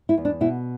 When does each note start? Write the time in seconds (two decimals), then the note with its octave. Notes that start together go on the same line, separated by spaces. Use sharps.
0.09 E4
0.17 E2
0.25 D4
0.41 B2 E4